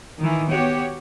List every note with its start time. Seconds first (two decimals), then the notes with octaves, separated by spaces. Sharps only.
0.19 D#3 E3
0.51 B3 F#4 G4 C#5